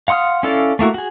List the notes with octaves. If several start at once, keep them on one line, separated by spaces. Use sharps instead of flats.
F5 F#5 C6 D#6 F6
C#4 E4 A4 D5 F5
A3 A#3 E4 F#4
F#4 G#4